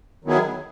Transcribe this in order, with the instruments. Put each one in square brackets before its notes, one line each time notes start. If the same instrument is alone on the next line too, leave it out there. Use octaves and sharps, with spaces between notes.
[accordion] D#3 F#3 B3 E4 G#4